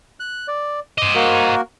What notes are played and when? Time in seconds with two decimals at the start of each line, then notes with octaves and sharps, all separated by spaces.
0.20 F#6
0.48 D5
0.98 C5 D#5 D6
1.15 A#3 F#4 A#4